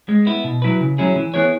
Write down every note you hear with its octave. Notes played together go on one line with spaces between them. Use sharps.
G#3
B3 E4
B2
F#3 E4 B4
C#3
F#3 C#4 E4 G#4
E3
B3 E4 G#4 C#5